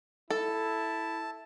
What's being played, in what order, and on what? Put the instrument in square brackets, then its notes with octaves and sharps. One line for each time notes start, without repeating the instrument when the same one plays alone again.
[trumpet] E4 [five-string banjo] A4 [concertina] A5